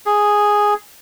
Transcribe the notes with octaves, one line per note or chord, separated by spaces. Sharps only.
G#4